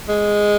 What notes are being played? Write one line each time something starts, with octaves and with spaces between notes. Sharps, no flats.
G#3